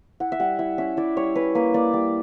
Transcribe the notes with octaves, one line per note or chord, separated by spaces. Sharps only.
E4 F#5
E5
G3 F#5
E4 E5
C#4 E5
E4 D5
G3 C#5
C#4 B4
A#3 B4
A#3 D5
G3 D5